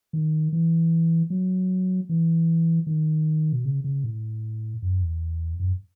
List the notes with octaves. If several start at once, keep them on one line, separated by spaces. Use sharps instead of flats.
D#3
E3
F#3
E3
D#3
B2
C#3
C#3
A2
F#2
E2
F#2